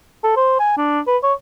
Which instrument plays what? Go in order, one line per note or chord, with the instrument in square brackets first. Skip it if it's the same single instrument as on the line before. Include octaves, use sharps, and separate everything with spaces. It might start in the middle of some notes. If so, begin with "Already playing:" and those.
[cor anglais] A4
C5
G#5
D4
B4
C#5